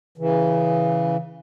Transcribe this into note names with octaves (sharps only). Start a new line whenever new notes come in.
C#3 E3